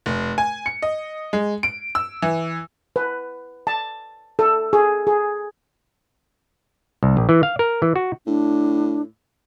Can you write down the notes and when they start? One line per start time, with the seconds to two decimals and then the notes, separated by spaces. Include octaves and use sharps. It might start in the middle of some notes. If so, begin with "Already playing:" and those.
0.06 F1
0.38 G#5
0.66 C#7
0.82 D#5
1.33 G#3
1.63 D7
1.95 E6
2.22 E3
2.96 B4
3.67 A5
4.39 A4
4.73 G#4
5.07 G#4
7.03 C2
7.17 A#1
7.29 E3
7.43 F5
7.59 A#4
7.82 E3
7.96 F#4
8.27 A2 D4